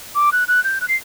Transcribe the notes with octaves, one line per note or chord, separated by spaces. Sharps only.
D6
F#6
F#6
G6
F#6
C7